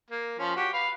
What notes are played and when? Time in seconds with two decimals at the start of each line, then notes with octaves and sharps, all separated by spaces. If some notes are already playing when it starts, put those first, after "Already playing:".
0.10 A#3
0.39 F3 C#4
0.56 F#4 G4
0.73 B4 F5